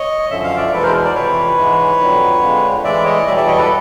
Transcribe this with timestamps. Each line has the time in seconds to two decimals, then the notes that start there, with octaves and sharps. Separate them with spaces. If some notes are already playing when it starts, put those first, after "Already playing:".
Already playing: C#5 D#5
0.30 F#2 D3 F3 E5
0.43 F5
0.57 D5 E5
0.73 E2 B2 G#3 A4 B4
0.83 A#4 C5
1.05 C5 D5
1.15 F2 C3 E3 B4 C#5
1.58 G#2 E3 G#3
2.00 F2 D3 F#3
2.42 F2 D3 F3 G#3
2.84 A2 E3 G#3 D5 E5
3.05 C#5 D#5
3.26 E2 B2 G3 D5 E5
3.37 D5 E5
3.48 C#5 D#5
3.58 A4 B4